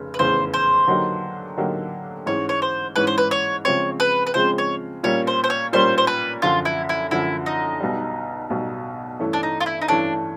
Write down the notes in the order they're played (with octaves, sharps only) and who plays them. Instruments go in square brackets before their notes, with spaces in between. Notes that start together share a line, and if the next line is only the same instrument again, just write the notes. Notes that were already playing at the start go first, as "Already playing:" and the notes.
Already playing: [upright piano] F1 C#3
[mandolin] B4
[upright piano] F1 E2 C#3 [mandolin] C5
[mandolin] C5
[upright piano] D3 F#3 A#3 D#4 G4
D3 F#3 A#3 D#4 G4
[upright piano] G#2 E3 G#3 C#4 [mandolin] C#5
[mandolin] C#5
C5
[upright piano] G#2 E3 G#3 C#4 [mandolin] B4
[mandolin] C5
B4
C#5
[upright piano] C#3 F3 G#3 C4 [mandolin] C#5
[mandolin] B4
B4
[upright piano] C#3 F3 G#3 C4 [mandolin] C5
[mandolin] C#5
[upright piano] A#2 G3 A#3 C#4 [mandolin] C#5
[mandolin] C5
C5
C#5
[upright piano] A#2 G3 A#3 C#4 [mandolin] C5
[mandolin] C5
B4
[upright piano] F#2 D3 F3 [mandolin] F4
[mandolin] E4
E4
[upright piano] F#2 D3 F3 [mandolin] E4
[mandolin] D#4
[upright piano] B1 B2 G3
B1 B2 G3
G2 E3 A3 C#4
[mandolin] D4
D#4
F4
E4
D#4
[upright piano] G2 E3 A3 C#4 [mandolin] D4